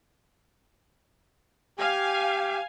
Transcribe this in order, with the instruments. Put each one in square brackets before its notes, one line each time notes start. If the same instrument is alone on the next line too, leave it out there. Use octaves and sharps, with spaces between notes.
[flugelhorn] G4 [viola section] F5 G#5